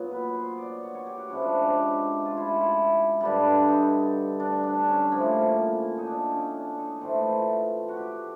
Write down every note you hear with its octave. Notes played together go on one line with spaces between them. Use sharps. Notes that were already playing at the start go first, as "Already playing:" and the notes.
Already playing: A#2 F#3 B3
B4
C5
D5
C#5
C#5
G4
F#4
G#2 F3 G#3 C#4 E4
D4
G4
G4
F4
E4
F4
E4
G2 D3 G3
D#4
D4
D4
C#4
A2 F3 A#3
D#4
D4
C#4
D4
D#4
A2 E3 A3 C4
F4
F#4
G4